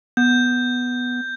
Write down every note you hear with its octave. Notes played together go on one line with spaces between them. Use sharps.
B3 G6